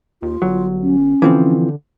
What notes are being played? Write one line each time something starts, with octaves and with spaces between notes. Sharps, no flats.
D#2 F4
G1 F#3
C#4
D3 E3 F3 C4